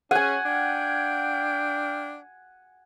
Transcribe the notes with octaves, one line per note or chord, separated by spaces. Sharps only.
C#4 G#4 F#5 G#5
D4 F5 G5